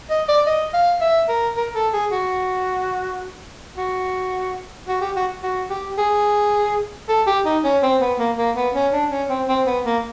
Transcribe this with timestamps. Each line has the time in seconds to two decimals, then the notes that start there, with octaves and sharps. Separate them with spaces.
0.10 D#5
0.28 D5
0.47 D#5
0.74 F5
1.01 E5
1.28 A#4
1.56 A#4
1.75 A4
1.93 G#4
2.11 F#4
3.77 F#4
4.88 F#4
5.01 G4
5.16 F#4
5.43 F#4
5.70 G4
5.98 G#4
7.09 A4
7.26 G4
7.45 D#4
7.64 C#4
7.82 C4
8.01 B3
8.19 A#3
8.38 A#3
8.56 B3
8.74 C#4
8.93 D4
9.11 C#4
9.29 C4
9.48 C4
9.66 B3
9.85 A#3